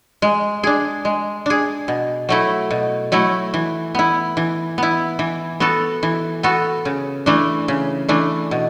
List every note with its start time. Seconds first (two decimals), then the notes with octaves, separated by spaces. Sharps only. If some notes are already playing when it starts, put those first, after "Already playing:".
0.22 G#3
0.63 D4 G#4
1.05 G#3
1.46 D4 G#4
1.88 B2
2.29 F#3 A3 E4
2.71 B2
3.12 F#3 A3 E4
3.54 E3
3.95 B3 E4
4.37 E3
4.78 B3 E4
5.19 E3
5.60 B3 F#4 A4
6.03 E3
6.43 B3 F#4 A4
6.85 C#3
7.26 E3 A3 D4
7.68 C#3
8.09 E3 A3 D4
8.51 B2